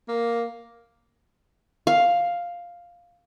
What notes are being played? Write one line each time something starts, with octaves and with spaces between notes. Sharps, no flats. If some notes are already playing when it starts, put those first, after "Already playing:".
A#3
F5